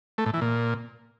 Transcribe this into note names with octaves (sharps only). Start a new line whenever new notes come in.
A3
A2
E3
A#2